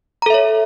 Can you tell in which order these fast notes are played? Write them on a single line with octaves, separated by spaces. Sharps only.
A#5 A4 E5 C#5